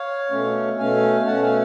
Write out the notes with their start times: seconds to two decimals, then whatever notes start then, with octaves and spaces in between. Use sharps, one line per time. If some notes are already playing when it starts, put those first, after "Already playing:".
Already playing: C#5 F5
0.31 B2 A3 C#4
0.78 B2 A3 C#4 F5 G#5
1.26 B2 A3 C#4 F#5 A5
1.42 F5 G#5